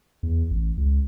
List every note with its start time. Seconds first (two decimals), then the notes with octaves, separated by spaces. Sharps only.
0.23 E2
0.51 A1
0.77 C#2